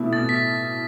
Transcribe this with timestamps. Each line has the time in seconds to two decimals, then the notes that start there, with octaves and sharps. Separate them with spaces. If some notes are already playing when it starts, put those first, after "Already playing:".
Already playing: B2 A3 E4
0.12 B2 A6
0.29 B6